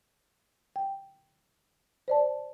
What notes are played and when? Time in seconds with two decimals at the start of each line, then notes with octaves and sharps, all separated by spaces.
0.76 G5
2.08 C5 D5 A5